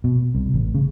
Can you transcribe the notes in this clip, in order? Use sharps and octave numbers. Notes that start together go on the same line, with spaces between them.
B2
C2
A1
C#3